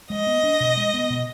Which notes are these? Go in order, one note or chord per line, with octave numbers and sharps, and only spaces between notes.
G#3 D#5
B3
D4
B2
G#3
B3
B2